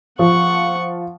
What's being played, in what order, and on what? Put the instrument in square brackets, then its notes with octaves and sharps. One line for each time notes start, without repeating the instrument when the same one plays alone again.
[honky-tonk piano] F3 [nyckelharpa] F#5 C#6